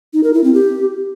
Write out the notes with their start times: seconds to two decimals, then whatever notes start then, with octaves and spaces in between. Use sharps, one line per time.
0.13 D#4
0.24 A#4
0.34 E4
0.44 C4
0.54 G4